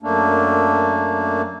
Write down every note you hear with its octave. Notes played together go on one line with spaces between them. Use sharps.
F#2 A3 A#3 D4